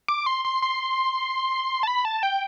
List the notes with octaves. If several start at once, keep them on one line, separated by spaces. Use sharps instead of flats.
D6
C6
C6
C6
A5
B5
A5
G5